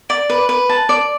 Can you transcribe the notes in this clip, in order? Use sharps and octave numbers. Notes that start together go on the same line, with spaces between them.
D5
B4
B4
A5
D5